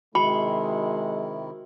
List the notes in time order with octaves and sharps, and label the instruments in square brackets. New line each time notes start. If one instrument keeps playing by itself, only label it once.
[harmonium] C3 D#3 E4 [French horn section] G#3 [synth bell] F#4 [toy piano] B5